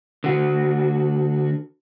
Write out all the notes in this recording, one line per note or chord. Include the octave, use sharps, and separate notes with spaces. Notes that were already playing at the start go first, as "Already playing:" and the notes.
D3 F#4